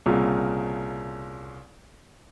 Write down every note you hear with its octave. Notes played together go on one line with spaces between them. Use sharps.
C2 A#2 C#3